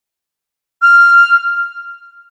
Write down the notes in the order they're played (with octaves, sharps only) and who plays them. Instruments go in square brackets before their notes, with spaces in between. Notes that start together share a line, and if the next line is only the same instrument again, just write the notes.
[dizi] F6